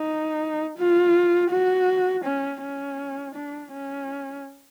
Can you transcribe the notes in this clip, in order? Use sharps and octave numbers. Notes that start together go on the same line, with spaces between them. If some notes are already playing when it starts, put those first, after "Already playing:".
Already playing: D#4
F4
F#4
C#4
C#4
D4
C#4